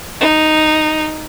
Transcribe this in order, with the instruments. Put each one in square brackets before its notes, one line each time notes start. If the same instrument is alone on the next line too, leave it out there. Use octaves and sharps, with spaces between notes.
[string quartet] D#4